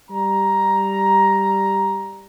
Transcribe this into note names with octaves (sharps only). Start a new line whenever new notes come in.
G3 A#5